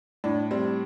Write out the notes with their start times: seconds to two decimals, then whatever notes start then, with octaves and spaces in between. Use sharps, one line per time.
0.24 A2 D4
0.51 G3 C4